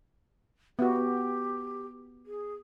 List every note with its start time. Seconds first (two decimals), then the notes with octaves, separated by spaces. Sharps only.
0.79 B3 F#4 G4
2.26 G#4